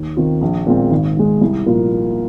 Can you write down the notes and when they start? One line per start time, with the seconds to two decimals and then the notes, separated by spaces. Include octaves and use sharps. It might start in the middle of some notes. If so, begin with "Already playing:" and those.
Already playing: D#2
0.17 D#3 C4 F4
0.41 A#1
0.67 A#2 G#3 C4
0.91 G#1
1.17 G#2 G#3
1.41 C2
1.66 A#2 F3 A#3 F4